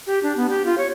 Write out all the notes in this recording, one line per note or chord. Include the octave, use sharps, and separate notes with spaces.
G4
D4
B3
G4
F4
C#5